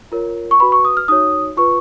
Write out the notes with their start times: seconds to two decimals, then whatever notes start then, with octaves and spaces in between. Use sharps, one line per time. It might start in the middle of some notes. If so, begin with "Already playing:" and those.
0.12 F4 A#4 C#5
0.51 C#6
0.60 F#4 B4 B5
0.72 C#6
0.85 D#6
0.97 F6
1.08 D#4 F#4 C#5 D#6
1.57 F4 B4 C#6